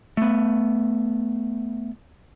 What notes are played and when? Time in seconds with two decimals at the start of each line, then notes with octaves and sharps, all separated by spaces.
0.17 A3 B3